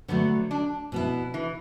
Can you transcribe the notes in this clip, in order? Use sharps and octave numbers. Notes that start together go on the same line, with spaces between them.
D3 F#3 A3 B3
D4
B2 B3 E4
E3